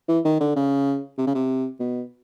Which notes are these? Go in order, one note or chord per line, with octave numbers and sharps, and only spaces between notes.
E3
D#3
D3
C#3
C3
C#3
C3
B2